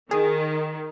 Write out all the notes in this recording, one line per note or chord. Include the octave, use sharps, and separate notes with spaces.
D#3 G#4